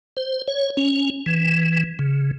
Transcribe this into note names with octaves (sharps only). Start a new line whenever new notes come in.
C5
C#5
C#4
E3
C#3